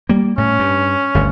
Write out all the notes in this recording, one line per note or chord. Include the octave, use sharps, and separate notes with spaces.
G3 A#3
A2 C#4
G2
G1 D2